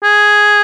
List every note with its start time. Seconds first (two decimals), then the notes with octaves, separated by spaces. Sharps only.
0.03 G#4